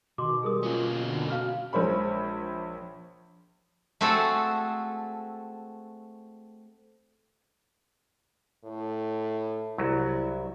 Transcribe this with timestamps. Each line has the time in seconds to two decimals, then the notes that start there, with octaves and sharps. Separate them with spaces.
0.18 B2 D#3 C6 D6
0.43 G3 G#4 A#4 D#6
0.63 A#3 C#4 F4
1.06 D3
1.30 F#4 F5 F6
1.73 A#1 G#3 C5 C#5 B5
4.01 A3 C4 F#4 G#4 A4
8.64 A2
9.78 C2 F#3 E4